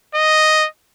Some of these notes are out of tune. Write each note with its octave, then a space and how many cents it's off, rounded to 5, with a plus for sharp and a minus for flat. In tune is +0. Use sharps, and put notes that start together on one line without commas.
D#5 +0